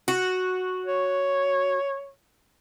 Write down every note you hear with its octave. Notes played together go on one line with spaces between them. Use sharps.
F#4
C#5